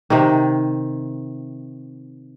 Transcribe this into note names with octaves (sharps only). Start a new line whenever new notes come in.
C3 D#3